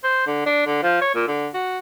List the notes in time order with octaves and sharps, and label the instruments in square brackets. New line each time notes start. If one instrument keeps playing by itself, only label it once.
[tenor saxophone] C5
D3
D4
D3
F3
C#5
A#2
D3
F#4